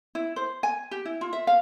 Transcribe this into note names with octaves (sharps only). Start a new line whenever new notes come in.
E4
C5
G#5
G4
E4
F4
E5
F5